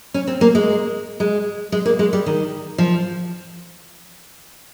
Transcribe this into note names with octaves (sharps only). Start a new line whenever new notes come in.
C#4
C4
A#3
G#3
G#3
G#3
A#3
G#3
G3
D#3
F3